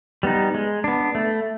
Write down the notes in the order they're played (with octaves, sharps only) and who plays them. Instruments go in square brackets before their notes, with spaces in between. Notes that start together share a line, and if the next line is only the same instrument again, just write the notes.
[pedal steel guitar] G3 B3 D#4
G#3
B3 D4
A3